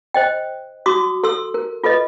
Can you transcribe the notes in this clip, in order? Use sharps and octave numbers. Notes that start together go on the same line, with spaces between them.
C5 D#5 G5
F#4 C6 D6 D#6
A4 C6 E6
A#4
F4 A4 B4 D#5